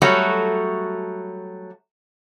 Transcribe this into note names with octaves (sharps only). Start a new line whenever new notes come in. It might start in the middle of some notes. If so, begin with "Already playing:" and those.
F#3 G3 A3 F#4 C#5